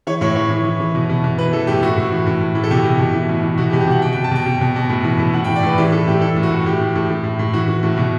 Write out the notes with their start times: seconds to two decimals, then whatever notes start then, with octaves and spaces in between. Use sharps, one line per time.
0.07 E3 C#5
0.21 A2 C#5
0.36 E3 C#5
0.50 E3
0.65 E3
0.80 E3
0.95 B2
1.09 B2
1.24 B2
1.38 E3 B4
1.53 E3 A4
1.67 A2 G4
1.83 A2 F#4
1.97 A2
2.11 E3
2.27 A2
2.41 A2
2.55 E3
2.64 A4
2.71 B2 G4
2.85 B2
2.99 B2
3.14 E3
3.29 A2
3.43 E3
3.58 B2 F#4
3.70 G4
3.73 B2
3.80 G4
3.87 B2 F#5
4.02 B2 G5
4.12 G5
4.16 B2
4.24 A5
4.31 B2 G5
4.46 B2
4.61 B2
4.76 B2
4.89 A2
5.04 E3
5.19 A2
5.33 A2 F#5
5.44 G5
5.48 E3
5.56 D5
5.63 A2 B4
5.77 E3 G4
5.92 E3 A4
6.06 A2 G4
6.21 E3 A4
6.36 A2
6.43 F#4
6.51 A2
6.66 A2 G4
6.80 E3
6.96 A2
7.10 A2
7.24 A2
7.39 A2
7.53 E3 F#4
7.68 E3
7.83 A2
7.97 B2